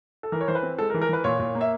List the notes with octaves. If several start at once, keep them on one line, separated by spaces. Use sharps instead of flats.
A4
E3 A#4
C#5
E3 C5
B4
C4
G#3 A4
A#4
E3
A#4
E3 B4
A#2 C#5
A#2
A#3
E5